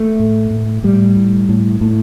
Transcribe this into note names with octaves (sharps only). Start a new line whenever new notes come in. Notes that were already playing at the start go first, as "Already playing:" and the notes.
Already playing: A3
A2
A2
A2 G3
A2
A2
A2